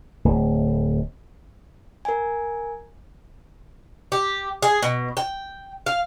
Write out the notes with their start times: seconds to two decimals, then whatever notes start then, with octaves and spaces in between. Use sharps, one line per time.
0.25 D1
2.05 A#4 G#5
4.12 G4
4.62 G#4
4.82 B2
5.17 G5
5.86 F5